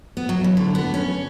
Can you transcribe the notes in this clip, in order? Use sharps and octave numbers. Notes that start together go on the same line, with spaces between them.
B3
F#3
E3
D3
B3
C#4